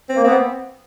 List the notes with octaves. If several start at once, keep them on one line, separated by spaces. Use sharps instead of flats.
C4
A#3
B3 C4